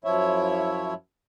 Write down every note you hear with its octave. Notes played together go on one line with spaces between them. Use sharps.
F#2 F3 E4 C#5 E5